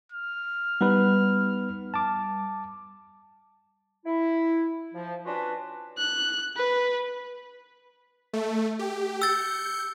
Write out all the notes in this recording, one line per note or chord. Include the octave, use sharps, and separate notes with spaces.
F6
G3 B3 D#4 B4
A5 D6
E4
F3
C#4 D4 F4 F#4 B4
F#6
B4
A3
G4
E6 G6 A6 C#7